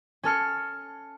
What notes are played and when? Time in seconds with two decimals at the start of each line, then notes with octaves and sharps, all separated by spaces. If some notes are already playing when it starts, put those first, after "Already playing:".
0.23 C#4 A4 F6 C#7